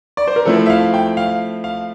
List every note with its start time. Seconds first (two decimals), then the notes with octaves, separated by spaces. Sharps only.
0.17 D5
0.27 C5
0.36 A#4
0.46 F3 A3 C4 E4 A4
0.66 E5
0.70 F5
0.94 G5
1.17 F5
1.64 F5